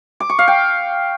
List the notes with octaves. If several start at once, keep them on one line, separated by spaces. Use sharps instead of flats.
D6
C#6
F5
G5